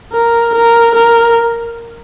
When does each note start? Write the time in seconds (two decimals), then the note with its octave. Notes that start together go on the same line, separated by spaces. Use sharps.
0.13 A#4
0.55 A#4
0.95 A#4